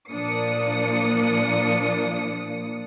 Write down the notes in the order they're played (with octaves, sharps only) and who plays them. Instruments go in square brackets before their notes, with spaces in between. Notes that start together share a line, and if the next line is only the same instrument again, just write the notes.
[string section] A#2 F3 A#3 D4 D#6 C#7